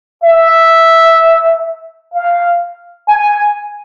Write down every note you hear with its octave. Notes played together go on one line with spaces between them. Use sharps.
E5
F5
G#5